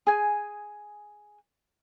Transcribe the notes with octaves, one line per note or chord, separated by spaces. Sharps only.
G#4 G#5